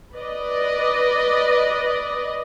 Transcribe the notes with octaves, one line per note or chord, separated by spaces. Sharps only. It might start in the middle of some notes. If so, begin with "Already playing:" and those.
B4 D5 D#5